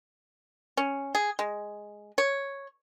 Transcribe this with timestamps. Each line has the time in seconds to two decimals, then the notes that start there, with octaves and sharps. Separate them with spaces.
0.77 C#4
1.15 G#4
1.39 G#3
2.18 C#5